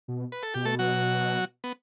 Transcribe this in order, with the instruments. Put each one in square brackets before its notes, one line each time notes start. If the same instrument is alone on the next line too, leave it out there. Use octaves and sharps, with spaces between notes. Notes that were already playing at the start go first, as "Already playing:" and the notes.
[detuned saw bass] B2
[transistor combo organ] B4
A4
[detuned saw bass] B2 [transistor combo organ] G4
[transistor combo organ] A3 A4
F#3 F#4
B3